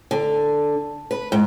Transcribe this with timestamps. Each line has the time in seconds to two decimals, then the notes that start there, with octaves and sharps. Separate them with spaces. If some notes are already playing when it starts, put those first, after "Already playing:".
0.11 D3
1.11 B4
1.32 G#2